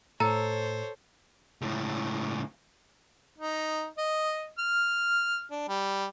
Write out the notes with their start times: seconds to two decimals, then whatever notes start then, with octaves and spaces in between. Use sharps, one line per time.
0.20 A2 A4 C5 C#5 A#5
1.61 C#2 A2
3.38 D#4
3.98 D#5
4.59 F6
5.51 D4
5.69 G3